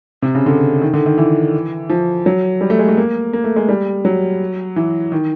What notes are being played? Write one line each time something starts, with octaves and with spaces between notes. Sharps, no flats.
C3
C#3
D3
D#3
D3
D#3
E3
F3
F#3
G3
A3
G#3
A3
A#3
A#3
A3
G#3
G3
F#3
E3
D#3